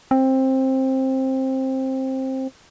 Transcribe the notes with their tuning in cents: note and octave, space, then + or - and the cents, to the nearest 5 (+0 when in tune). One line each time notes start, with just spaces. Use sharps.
C4 +15